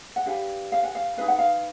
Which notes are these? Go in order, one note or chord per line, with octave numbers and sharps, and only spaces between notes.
F#5
D4 G4 B4 F5
F5
F#5
F5
D#4 G#4 B4 F5
F#5
F5